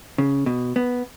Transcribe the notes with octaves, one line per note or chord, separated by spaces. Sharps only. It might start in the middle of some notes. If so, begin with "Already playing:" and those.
C#3
B2
B3